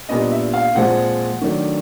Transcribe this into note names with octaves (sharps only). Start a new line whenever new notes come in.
A#2 G3 B3 D4 D#5
E5
F5
A#2 F3 G#3 C4 F#5
D#3 F#3 A3 D4